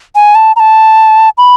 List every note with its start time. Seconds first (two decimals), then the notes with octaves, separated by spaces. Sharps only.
0.15 G#5
0.35 A5
0.56 A#5
0.60 A5
1.38 B5